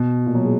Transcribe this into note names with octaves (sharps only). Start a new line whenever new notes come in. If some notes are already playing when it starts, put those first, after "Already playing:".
Already playing: B2
A#2
F#3
G#3